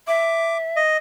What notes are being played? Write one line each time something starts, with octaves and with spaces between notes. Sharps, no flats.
E5 D6
D#5